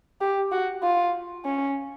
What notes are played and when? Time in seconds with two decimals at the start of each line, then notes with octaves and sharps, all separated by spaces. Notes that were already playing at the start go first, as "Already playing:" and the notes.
0.21 G4
0.52 F#4
0.83 F4
1.45 C#4